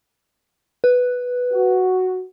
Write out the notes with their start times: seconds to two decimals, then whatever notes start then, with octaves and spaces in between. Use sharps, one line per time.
0.84 B4
1.52 F#4